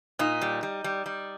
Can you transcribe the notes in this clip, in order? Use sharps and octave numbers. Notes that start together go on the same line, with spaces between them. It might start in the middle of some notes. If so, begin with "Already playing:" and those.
A#2 D#4
G3
G3
G3
G3